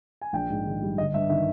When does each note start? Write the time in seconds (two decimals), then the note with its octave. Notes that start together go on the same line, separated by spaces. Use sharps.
0.21 G#5
0.33 A#1 G5
0.49 G#2
0.66 D#3
0.82 G3
0.98 G1 D#5
1.14 G2 E5
1.30 D#3 E5